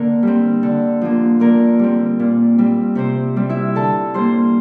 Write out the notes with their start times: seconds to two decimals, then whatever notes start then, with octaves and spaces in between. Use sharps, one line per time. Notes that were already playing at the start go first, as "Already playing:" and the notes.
Already playing: D3 A#3 A#4
0.23 G3 C4
0.63 D3
1.01 F3 A#3
1.40 D3 A#3 A#4
1.79 G3 C4
2.19 A#2
2.58 G3 C4
2.95 C3 C4 C5
3.36 G3 C4
3.49 E4 E5
3.75 D3 A4 A5
4.14 G3 A#3 C5 C6